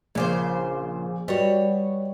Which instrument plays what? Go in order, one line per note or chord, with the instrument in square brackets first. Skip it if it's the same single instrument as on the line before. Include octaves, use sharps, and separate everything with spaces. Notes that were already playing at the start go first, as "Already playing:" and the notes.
[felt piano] A#1 D6 [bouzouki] A#2 C#3 C5
[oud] G3 F#4 [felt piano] B4 D#5 [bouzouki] C#5